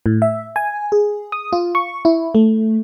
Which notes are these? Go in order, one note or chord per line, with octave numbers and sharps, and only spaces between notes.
A2
E5
G#5
G#4
D#6
F4
C#6
E4
A3